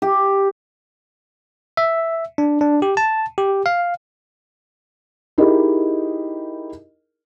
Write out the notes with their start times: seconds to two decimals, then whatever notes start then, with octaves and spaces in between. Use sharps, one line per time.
0.02 G4
1.77 E5
2.38 D4
2.61 D4
2.82 G4
2.97 A5
3.38 G4
3.66 F5
5.38 D#4 E4 G4 G#4 A#4 D#5